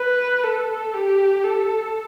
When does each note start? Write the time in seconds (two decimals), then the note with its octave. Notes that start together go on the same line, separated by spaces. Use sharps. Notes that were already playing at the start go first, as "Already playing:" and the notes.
Already playing: B4
0.43 A4
0.94 G4
1.43 A4